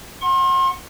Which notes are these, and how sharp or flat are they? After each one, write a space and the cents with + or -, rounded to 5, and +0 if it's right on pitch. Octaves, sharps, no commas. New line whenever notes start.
F#5 +0 C6 +35